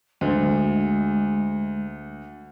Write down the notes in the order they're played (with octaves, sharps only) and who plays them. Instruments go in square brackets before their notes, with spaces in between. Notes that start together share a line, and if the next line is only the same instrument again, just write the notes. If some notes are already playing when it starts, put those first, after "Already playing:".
[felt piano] D2 [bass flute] G#3